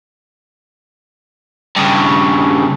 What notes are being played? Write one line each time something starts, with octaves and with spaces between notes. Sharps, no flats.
G2 C#3